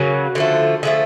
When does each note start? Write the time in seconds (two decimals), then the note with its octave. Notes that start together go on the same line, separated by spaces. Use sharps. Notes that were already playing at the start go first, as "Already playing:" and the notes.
Already playing: C#3 F#3 A#3 F#4
0.35 D3 F3 A3
0.83 D3 F3 A3 G#4